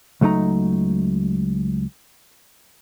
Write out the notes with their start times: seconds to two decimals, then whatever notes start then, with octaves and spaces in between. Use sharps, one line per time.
0.21 C#2 F#3 A3 D#4 A#5